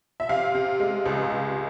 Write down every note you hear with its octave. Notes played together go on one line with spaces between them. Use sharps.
E5
C3 F5
C3
G#3
C#2
C3